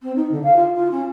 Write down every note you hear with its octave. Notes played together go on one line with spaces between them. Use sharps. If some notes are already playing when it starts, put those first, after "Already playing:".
C4
D#4
D3
F5
F4
F4
C#4